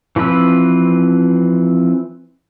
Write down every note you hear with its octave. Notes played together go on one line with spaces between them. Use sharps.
E3 F3 C4 B4 E6